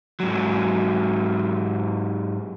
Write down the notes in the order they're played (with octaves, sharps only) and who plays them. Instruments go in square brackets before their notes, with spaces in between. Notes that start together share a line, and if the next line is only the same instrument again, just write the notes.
[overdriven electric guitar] G#2 F#3